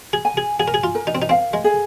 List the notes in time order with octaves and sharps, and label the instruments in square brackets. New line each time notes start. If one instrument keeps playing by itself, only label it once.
[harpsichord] G#4
[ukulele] G#5
[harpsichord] G#4
[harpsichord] G#4 [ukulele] G#5
[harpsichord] A#4
G#4
F4
[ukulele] A#4
[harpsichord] D#4
C4
D#4
[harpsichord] C4 [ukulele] F5
[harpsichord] G#3
[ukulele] G#4